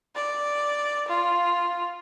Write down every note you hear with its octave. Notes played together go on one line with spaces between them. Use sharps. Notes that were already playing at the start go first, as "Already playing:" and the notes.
D5
F4